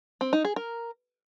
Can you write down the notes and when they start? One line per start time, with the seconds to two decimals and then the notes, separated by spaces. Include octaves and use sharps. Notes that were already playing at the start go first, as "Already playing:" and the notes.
0.21 C4
0.33 D#4
0.45 G#4
0.56 A#4